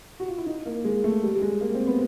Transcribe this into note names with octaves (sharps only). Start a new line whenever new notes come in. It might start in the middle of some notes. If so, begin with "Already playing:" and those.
F#4
F4
E4
D#4
A#3
G#3
A3
G3
G3
G#3
A#3
C4
B3